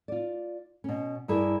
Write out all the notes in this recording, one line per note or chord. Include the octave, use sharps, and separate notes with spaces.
F4 D5
B2 C#4
G2 E4 G#4 A#4 D5